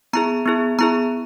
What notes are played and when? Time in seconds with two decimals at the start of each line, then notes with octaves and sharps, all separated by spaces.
0.13 B3 E4 G#4 A#5
0.46 B3 E4 G#4
0.79 B3 E4 G#4 A#5